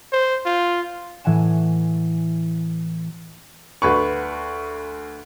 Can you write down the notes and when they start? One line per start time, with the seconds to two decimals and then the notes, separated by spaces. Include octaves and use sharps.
0.12 C5
0.46 F4
1.24 A2 E3 F#5 G#5 E7
3.82 D2 B4 C#6